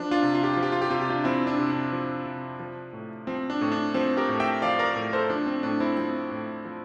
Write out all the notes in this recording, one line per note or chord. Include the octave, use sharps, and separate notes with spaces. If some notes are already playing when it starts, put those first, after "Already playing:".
Already playing: F3 D4
D4 F4
C3
F4
G4
F3 F4
G4
F4
G4
C3 F4
G4
D4 F4
F3 C4 E4
D4
C3
D4
F3
C3
F3
A2
F3 C4
D4
A2
D4
F3 C4
G4 A#4
A2
E5 G5
F3 D5 F5
A#4 D5
A2
A4 C5
F3 D4
C4
A2 D4
C4 E4
F3 C4
A2
F3